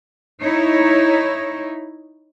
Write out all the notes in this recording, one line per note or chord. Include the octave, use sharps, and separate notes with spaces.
D#4 E4 C#5